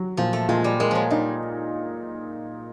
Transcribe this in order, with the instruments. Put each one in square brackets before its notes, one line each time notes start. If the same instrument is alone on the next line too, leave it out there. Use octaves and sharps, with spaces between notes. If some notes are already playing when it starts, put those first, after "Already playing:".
Already playing: [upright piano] F#3
[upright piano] A#2 [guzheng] F3
[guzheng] A3
[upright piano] A#2 [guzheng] G#3
[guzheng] G3
[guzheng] G#3 [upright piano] A#3
[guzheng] F3 F#3
[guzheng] G3 [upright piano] D#4